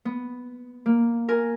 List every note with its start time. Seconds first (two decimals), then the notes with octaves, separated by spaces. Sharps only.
0.05 B3
0.86 A#3
1.28 A#4 G#5